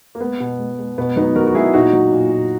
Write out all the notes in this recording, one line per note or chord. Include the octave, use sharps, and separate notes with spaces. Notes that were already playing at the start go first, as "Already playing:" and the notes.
A#3
G#3 B3
B2
G#3
G#3
B2 B3
F#3 B3 D#4
F#3 F#4 A#4
F#4
F#3 E4 G#4
A#2 D#4 F#4
F#3
A#2
A#2